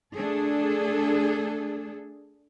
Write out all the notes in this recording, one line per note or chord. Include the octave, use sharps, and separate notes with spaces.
A3 D4 G#4 A4